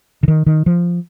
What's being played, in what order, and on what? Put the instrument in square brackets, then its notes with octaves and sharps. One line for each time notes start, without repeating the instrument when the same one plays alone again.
[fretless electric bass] D3
D#3
D#3
F3